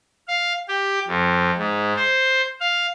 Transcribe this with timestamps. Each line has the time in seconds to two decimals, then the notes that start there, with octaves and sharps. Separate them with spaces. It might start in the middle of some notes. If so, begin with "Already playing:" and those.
0.28 F5
0.68 G4
1.07 F2
1.58 G#2
1.96 C5
2.60 F5